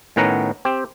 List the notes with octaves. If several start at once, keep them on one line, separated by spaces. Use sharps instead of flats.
A2 D#3 B3 C#4 F#5 A#5
C4 G4